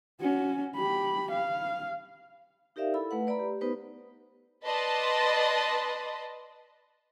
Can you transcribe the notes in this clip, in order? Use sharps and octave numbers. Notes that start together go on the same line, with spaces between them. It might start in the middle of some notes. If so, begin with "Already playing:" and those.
C#4 F#4
G4 B5
F5
D#4 G4 A#4 D5 E5 F5
E4 A4 B5 E6
A3 B4 F#5
B4 D5 A#5 B5
G4
B3 D#4 G4 B4 C5
B4 D5 D#5 A5 B5 C6